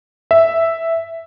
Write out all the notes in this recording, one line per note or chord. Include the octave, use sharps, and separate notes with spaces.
E5